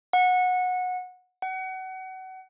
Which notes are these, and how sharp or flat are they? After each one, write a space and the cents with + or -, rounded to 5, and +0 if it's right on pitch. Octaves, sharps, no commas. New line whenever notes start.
F#5 -20
F#5 +30